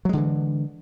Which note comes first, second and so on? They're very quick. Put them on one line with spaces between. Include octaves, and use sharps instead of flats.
F#3 G#3 D3 E3